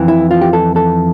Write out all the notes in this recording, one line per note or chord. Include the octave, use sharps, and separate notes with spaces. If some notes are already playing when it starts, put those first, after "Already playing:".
Already playing: F2 E3
E4
F4
G4
A4
A4